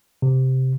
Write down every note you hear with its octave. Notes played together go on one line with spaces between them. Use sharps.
C3